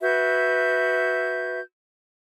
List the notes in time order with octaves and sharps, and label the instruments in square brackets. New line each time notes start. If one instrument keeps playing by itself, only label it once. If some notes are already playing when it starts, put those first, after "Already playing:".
[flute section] F#4 B4 E5 G6